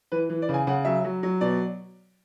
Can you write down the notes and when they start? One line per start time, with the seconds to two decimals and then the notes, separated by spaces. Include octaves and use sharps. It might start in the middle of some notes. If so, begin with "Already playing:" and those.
0.12 E3 B4
0.29 E3
0.42 D5
0.49 C#3
0.54 G#5
0.67 C#3 F#5
0.85 F#3 E5
1.05 F#3
1.23 F#3
1.41 B2 D5